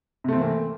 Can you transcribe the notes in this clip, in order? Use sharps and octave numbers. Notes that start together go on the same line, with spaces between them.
C3 E3 A3 A#3 C4